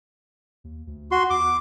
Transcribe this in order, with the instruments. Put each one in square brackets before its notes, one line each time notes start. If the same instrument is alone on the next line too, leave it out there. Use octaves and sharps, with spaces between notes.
[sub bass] D#2
D2
[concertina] F#4 C6
[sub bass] E2 [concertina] D6